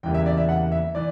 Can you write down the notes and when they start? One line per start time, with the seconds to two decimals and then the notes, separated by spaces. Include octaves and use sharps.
0.03 E2 C#3 E3 G3 A#3 G5
0.14 E5
0.26 D5
0.37 E5
0.49 F#5
0.72 E5
0.95 E3 D5